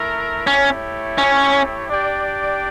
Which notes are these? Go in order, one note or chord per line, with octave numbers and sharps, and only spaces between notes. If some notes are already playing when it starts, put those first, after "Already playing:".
Already playing: A3 E4 A#4 E5
A3 C#4 E4 G4 C#5
C#4
D4 G4 D5 G5